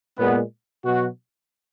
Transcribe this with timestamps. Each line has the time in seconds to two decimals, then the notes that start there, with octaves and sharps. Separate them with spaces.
0.18 A#2 G#3 B3
0.84 B2 F#3 F#4